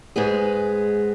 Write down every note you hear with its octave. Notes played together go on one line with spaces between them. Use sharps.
G#2 G#3 B3 G#4